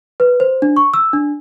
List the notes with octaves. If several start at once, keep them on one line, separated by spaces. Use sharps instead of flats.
B4
C5
D4
C#6
E6
D4